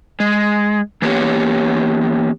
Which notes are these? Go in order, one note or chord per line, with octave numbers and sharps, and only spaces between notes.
G#3
E3 A#3 B3 C#4 G4 C#5